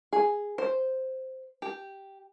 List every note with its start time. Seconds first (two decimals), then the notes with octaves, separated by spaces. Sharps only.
0.13 G#4
0.58 C5
1.62 G4